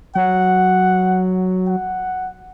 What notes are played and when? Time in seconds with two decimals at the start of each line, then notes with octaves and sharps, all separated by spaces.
0.16 F#3 F#5
1.68 F#5